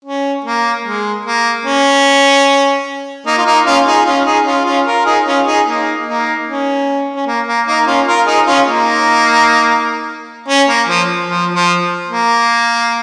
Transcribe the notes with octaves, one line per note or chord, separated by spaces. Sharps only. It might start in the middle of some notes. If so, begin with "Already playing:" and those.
C#4
A#3
G#3
A#3
C#4
A#3 D#4
F4
A#3 D#4
C#4 F4
D#4 G#4
C#4 F4
D#4 G#4
C#4 F4
C#4 F4
F4 A#4
D#4 G#4
C#4 F4
D#4 G#4
A#3 D#4
A#3 D#4
C#4
C#4
A#3
A#3
A#3 D#4
C#4 F4
F4 A#4
D#4 G#4
C#4 F4
A#3 D#4
C#4
A#3
F3
F3
F3
A#3